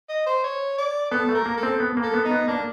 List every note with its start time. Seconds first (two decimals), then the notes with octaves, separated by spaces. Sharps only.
0.09 D#5
0.26 C5
0.44 C#5
0.78 D5
1.11 B3 A4
1.29 A3
1.35 A#4
1.46 A#3
1.57 A4
1.63 C4
1.80 B3
1.97 A#3
2.03 A4
2.14 B3
2.25 D#4
2.31 B3
2.48 A#3 D4